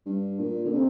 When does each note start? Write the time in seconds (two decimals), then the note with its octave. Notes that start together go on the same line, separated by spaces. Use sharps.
0.06 G2
0.39 A#2
0.64 D3
0.73 C3